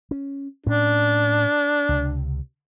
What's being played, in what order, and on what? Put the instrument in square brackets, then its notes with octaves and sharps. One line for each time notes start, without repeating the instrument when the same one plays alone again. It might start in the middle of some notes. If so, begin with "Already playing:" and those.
[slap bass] C#4
[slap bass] A2 C#4 [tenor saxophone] D4
[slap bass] C#2 C3